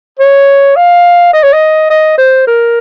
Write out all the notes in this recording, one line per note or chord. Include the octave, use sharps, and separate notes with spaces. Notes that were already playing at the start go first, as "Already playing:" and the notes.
C#5
F5
D#5
C#5
D#5
D#5
C5
A#4